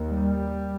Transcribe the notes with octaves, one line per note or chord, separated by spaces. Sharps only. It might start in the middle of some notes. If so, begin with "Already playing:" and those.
Already playing: D#2
G3